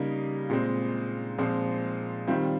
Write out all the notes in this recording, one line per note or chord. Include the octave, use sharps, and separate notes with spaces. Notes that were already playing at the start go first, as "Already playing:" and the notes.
Already playing: C#3 G3 A#3 D#4
A#2 G#3 C4
A#2 F3 G#3 C4
D#3 G3 C4 F4